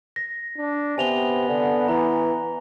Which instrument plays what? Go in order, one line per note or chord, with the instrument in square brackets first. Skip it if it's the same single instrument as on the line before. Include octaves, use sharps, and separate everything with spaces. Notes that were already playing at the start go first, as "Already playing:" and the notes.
[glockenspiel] A#6
[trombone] D4
[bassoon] C3 [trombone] B3 [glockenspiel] G#5 F7 G7
[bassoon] D3
[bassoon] E3 [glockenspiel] A#5